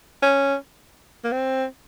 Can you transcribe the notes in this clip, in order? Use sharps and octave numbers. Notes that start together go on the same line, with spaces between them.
C#4
A#3
C4